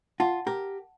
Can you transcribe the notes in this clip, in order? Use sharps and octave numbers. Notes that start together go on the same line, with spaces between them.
F4 F#5 A5
G4 A#4